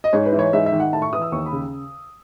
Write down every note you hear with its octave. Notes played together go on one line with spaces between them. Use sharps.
D#5
G#2 C#5
B4
E3
C#5
G#2 E5
E5
D#3
F#5
A2 A5
C#6
E3 D#6
E6
D#2 C#6
B5
C#3